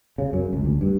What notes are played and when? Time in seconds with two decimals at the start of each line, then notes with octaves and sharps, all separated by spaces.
0.18 C#3
0.33 F#2
0.53 C#2
0.65 D2
0.81 G2